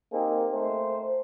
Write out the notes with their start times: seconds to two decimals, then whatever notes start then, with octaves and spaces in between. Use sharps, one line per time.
0.13 A#3 C4 D#4 G4 G#4
0.53 A3 A#4 C5